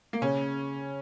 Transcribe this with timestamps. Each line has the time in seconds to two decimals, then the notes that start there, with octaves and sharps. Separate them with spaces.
0.13 A#3
0.22 C#3 C#4